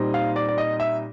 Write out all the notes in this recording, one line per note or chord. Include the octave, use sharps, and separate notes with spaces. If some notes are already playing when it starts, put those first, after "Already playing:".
Already playing: A#2 G3 C4 D#4
F5
D5
D5
D#5
E5